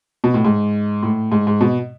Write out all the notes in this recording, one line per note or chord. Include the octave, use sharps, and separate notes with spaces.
B2
A2
G#2
A2
G#2
G#2
B2